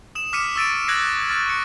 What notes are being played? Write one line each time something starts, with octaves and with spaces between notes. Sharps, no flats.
D#6 E7
D6 F6 B6 C#7 D#7
C#6 E6 A6 D7 D#7
D#6 F#6 G#6 A#6 C7
C#6 F6 A6
C#6 C#7